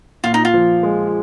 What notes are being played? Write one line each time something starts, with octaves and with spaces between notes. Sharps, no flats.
A#2 F4
D#4
F4
F3
G#3